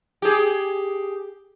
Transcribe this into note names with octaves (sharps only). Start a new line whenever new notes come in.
G4 G#4